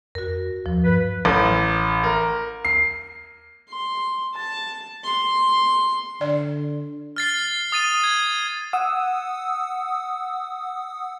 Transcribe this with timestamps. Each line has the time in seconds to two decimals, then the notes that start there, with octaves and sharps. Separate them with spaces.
0.15 F2 F#4 A#4
0.66 D#2 F3
0.84 G2 B4
1.25 A1
2.03 A#4
2.65 C7
3.68 C6
4.34 A5
5.04 C6
6.21 D3 D5
7.16 F6 A6 C7
7.72 D#6 A6 D#7
8.04 G#6
8.73 F#5 D#6 E6